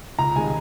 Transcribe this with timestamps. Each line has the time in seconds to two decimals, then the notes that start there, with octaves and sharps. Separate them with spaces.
0.19 C#2 A#5
0.35 C3 D#3 G#3 G#5